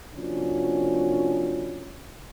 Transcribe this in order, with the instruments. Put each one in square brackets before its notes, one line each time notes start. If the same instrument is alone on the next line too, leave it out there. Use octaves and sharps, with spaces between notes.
[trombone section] C3 F3 A#3 C#4 D4 F#4